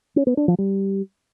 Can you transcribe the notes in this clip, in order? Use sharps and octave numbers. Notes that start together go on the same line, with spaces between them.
C#4
B3
D4
F3
G3